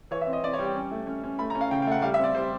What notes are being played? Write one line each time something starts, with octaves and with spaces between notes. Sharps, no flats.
E3 C#5
E5
C4
D#5
C4 D5
C#5
G3
G5
C#4
A3
C#4
C#4
A3 B5
A#5
C#4
F5
C#3 G5
G5
A3 F#5
G3 F5
E5
C4 D5
G3 C5